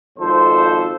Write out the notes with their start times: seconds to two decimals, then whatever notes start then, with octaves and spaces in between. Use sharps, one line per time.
0.19 G#1 F2 F3 A4 C5